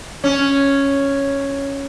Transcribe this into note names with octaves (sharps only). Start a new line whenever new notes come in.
C#4